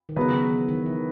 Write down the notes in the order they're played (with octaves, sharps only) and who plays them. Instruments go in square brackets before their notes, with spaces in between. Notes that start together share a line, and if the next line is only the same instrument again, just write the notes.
[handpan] D#3
[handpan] C#3 [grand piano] F#3 B3 F#4 B4
[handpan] D#3
E3
D#3
E3